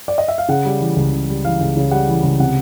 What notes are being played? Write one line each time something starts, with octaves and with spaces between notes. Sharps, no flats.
D5
D#5
E5
F5
C#3 F#5
G3
E3
C#2
C#3
G3
E3 F5
C#2
C#3
G3 F#5
E3
C#2
C3 F#5